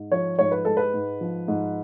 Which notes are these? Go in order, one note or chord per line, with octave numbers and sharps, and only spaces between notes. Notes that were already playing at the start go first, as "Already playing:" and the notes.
Already playing: G#2
F3 C#5
G#2 C#5
B4
G#3 A4
B4
G#2
F3
G#2